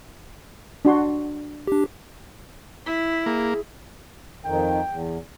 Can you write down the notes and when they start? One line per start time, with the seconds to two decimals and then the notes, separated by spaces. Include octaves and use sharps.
0.85 D4 F#4 C6
1.67 D4 G4
2.86 E4 B6
3.26 A#3 G#4
4.45 F2 D#3 G5
4.91 E2